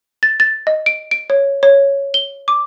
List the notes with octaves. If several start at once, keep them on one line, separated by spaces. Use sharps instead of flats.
A6
A6
D#5
D7
D7
C#5
C#5
G7
D6